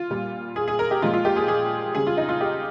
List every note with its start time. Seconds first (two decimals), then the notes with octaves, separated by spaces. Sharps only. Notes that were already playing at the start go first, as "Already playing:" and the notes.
Already playing: F4
0.10 A#2 G3
0.56 G#4
0.68 G#4
0.79 A#4
0.91 G4
1.02 A#2 F3 G#3 F4
1.14 F4
1.25 G4
1.36 G#4
1.48 G#4
1.95 C#3 G3 G#4
2.07 F4
2.17 D#4
2.29 F4
2.41 G4